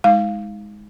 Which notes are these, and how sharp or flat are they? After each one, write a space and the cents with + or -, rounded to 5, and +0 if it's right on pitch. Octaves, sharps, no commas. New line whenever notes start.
G#3 +0 D#4 +35 F5 +0